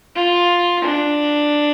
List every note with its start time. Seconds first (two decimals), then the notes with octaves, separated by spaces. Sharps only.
0.16 F4
0.85 D4